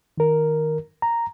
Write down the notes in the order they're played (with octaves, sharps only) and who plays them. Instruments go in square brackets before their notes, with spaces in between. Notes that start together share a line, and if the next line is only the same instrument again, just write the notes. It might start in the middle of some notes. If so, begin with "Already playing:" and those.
[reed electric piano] D#3 A#4
A#5